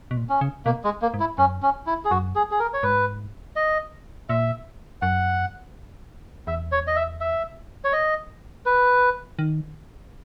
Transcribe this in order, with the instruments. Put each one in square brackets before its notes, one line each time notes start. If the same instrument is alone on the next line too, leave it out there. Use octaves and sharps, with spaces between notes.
[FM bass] B2
A#2
[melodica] C#4
[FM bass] C#3
[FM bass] B2 [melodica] A#3
[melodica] G#3
A#3
[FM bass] G#2
[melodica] E4
[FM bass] F#2 [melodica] C#4
[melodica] C#4
E4
G#4
[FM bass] F#2 [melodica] F#4
[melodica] G#4
G#4
A#4
C#5
[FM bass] G#2 [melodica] B4
[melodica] D#5
[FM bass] A#2 [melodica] E5
[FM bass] F#2 [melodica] F#5
[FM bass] E2 [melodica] E5
[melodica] C#5
D#5
E5
E5
C#5
D#5
B4
[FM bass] D#3